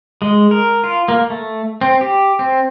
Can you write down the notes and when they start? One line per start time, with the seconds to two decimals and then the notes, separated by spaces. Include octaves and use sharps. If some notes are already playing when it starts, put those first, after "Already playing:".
0.22 G#3
0.51 A#4
0.84 F4
1.08 A#3
1.30 A3
1.81 C4
2.01 G4
2.39 C4